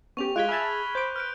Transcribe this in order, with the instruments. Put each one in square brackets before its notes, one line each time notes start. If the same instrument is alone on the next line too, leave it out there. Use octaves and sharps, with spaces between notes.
[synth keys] B3 C#4 G4 [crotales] C#6 F7
[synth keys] G#3 [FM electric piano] F4 G#6 B6 [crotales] F#6 D7 G7
[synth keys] G#4 E5 A5 [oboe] B5 [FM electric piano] F6 G#6
[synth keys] C5 D6 [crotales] G6
[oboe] B4 [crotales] F6 G6 D7